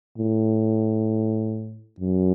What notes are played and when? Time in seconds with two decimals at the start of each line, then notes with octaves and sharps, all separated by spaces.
0.18 A2
2.00 F#2